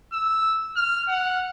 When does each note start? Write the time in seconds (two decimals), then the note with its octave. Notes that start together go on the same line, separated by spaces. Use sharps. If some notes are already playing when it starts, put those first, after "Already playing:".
0.13 E6
0.77 F6
1.09 F#5